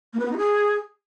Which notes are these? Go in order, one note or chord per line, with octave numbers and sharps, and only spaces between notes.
A#3
B4
B3
D#4
G#4